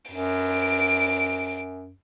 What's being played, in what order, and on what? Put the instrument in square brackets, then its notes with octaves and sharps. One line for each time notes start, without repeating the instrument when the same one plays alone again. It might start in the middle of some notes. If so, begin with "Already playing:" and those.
[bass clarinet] F#2 [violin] D7